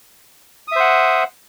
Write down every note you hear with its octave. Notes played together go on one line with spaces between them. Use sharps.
C5 E5 F#5 D#6